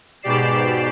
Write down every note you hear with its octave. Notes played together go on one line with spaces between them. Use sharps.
G#2 B2 G4 D5 C7 E7